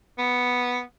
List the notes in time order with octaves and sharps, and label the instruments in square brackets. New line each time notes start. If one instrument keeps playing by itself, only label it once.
[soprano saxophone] B3